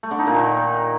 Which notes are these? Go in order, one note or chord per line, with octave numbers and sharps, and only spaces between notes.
A3
D3
D#4
A#2
D#3